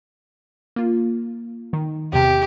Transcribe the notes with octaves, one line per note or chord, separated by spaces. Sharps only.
A#3 F4
D#3
E2 C3 G4